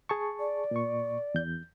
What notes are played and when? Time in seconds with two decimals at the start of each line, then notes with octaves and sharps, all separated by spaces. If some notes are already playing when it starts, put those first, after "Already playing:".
0.09 G#4 A5 C#6
0.39 D5
0.71 A#2 C#6
1.34 E2 G6